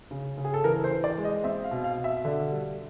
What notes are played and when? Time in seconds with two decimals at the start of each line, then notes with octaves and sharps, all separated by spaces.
0.11 C#3
0.38 C#3
0.45 G#4
0.54 A4
0.64 E3 A#4
0.84 C5
0.91 E3
1.04 D5
1.18 G#3
1.24 D#5
1.44 C4 E5
1.64 F5
1.71 B2
1.84 F5
1.98 B2
2.04 E5
2.25 D3
2.51 G3